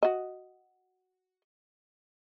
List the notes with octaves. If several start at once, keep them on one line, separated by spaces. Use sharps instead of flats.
F#4 D#5